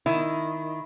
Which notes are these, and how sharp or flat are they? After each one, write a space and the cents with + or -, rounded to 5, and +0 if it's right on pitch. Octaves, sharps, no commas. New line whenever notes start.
D#3 +0 E4 +0